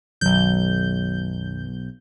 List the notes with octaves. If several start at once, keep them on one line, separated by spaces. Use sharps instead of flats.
B1 F#2 D#3 F#3 G6